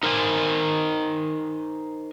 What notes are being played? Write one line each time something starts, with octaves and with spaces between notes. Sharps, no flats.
D#4 A#4 C5 G5 G#5